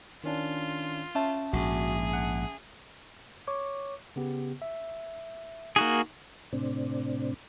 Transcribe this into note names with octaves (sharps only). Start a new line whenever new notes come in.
D#3 C#4 D4 F4
C#4 E5 A5
A#1 G#2 F#4 G#4
F#5
C#5 C#6 D6
C#3 B3 G4
E5
A#3 D#4 F#4 G#4
A2 C3 C4 D4